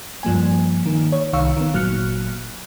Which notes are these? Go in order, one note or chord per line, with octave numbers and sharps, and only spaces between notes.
G2 F3 A#3 G#5
D#3 A#3
C#5
C2 D#3 F5 C#6 E6
D#3 B3
G1 A#2 F#3 F6 F#6 C#7